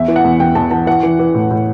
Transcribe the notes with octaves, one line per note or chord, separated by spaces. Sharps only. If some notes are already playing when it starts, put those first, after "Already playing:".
Already playing: E2 E5
E3
F#5
E2
E2 G5
E2 A5
E3 A5
E3 F#5
E3
E3
A2
A2